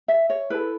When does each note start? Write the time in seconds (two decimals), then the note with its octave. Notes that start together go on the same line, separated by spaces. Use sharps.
0.08 E5
0.30 C#5
0.50 E4 A4 B4